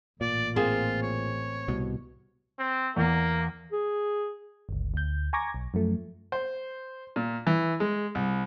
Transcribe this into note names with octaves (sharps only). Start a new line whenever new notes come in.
A1 A#2 D5
A#3 C4 F4 G#4
C#5
C2 B2
C4
E2 A#3
G#4
G1 C#2
D2 G6
G#5 A#5 C#6 D6 G#6 A#6
B1
F#2 F3 A3
C5
A#2
E3
G#3
C2